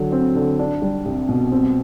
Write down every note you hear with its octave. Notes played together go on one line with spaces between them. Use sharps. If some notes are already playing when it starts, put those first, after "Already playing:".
Already playing: D3 F#3
C4
D3
D4
G3
C2
B2
C4